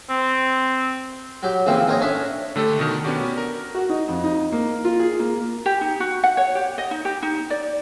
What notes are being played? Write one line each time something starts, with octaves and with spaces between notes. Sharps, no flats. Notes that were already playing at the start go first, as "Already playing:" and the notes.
C4
F#3 G4
C#3 E3 F3 A#3 C4
D#4 A#4 C5 C#5 D#5
C#4 D4 A4 C#5 E5
D3 A3 G4 A4
B2 D#3
B3 C#4 D4 F#4 G4
A#4
F#4
D#4
F2
D#4
A#3
F4
G#4
A#3
G4
D#4
F#4
F#5
C#5
G4
D#5
D#4
G4
D#4
D5